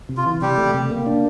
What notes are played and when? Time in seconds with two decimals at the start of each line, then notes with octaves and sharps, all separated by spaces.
0.09 C3
0.17 F4
0.26 E3
0.41 C3 G3 G4
0.58 A3
0.74 C3
0.91 A#3
1.06 D4